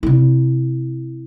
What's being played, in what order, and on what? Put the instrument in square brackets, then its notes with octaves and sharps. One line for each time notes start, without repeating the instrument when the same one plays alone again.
[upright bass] C3 E4